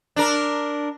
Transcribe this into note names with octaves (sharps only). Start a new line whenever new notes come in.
D4 A#4